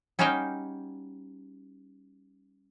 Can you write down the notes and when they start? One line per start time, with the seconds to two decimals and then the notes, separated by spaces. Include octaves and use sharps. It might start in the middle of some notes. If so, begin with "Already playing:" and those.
0.19 G3 C#4 D#4 F#4 F5 G5